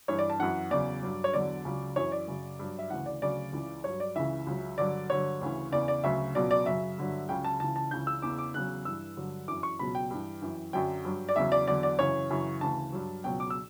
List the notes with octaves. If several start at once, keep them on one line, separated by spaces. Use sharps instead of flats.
G2 E3 C#5
D5
A5
F#2 E3 F#5
E2 C#3 F#3 D5
G2 F#3
C#5
E2 D3 F#3 D5
C#2 C#3 F#3
F#2 E3 C#5
D5
F#2 C#3 F#3
G2 F#3
E5
D2 C#3 E3 F#5
D5
D2 C#3 F#3 D5
C#2 C#3 E3
G2 F#3 C#5
D5
C#2 C#3 E3 E5
C#2 C#3 F#3
G2 D3 F#3 D5
G2 D3 F#3 C#5
D2 C#3 E3
E2 C#3 E3 D5
D5
D2 C#3 F#3 E5
C#2 B2 F#3 D5
D5
F#2 C#3 F#3 E5
G2 D3 F#3
C#2 C#3 F#3 G5
A5
C#2 C#3 E3 A5
A5
C#2 C#3 E3 G6
E6
E2 C#3 E3 D6
D6
E2 C#3 F#3 F#6
G2 E3 E6
G2 D3 F#3
F#2 E3 D6
C#6
C#2 B2 F#3 B5
G5
G2 E3
F#2 E3
F#2 D3 F#3 G5
G2 F#3
D5
E2 C#3 F#3 E5
D5
E2 D3 F#3 D5
D5
F#2 C#3 E3 C#5
F#2 C#3 E3
D2 C#3 E3 A5
G2 F#3
C#2 B2 F#3 G5
D6
E6